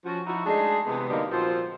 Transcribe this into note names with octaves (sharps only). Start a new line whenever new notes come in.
F3 C#4 F#4
F3 D#4 E4 F#4
G#3 A3 D4 D#4 G#4
C3 E3 G#3 B3
D3 F#3 G3 A#3 B3 D#4
A#2 F3 C4 F4 F#4 C5